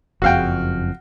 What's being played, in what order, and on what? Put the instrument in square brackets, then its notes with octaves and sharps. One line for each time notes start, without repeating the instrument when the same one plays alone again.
[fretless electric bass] F#1 F2 [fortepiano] F#4 F5 G5